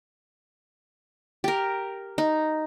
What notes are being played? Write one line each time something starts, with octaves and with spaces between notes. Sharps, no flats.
G4 A#4
D#4